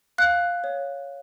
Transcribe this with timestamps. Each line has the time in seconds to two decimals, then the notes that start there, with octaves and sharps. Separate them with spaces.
0.18 F5 F#6
0.64 C#5